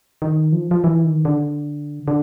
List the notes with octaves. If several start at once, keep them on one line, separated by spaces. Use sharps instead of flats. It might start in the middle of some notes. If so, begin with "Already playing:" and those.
D#3
F3
F3
E3
D#3
D3
D3